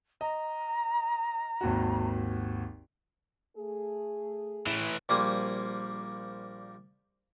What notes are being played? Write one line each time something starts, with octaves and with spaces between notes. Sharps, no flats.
D#5 A#5
G#1 D#2 F#4
A3 G#4
A2 E3
A#1 G3 A#3 C5 G#5